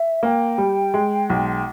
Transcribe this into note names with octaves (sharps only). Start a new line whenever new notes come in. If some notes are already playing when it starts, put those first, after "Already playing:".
Already playing: E5
A#3 G5
G3
G#3
B1